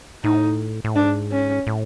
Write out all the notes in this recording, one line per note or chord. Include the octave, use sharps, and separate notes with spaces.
A2 D#4
A2
G#2 D4
C#4
A2